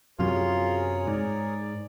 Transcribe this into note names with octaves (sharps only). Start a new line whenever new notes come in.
F#2 C3 F#3 F4 G#4 A#4 C#5
G#2 D5